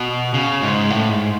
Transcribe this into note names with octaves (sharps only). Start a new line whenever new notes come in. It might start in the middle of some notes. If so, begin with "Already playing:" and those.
Already playing: B2
C#3
G#2
A2
G#2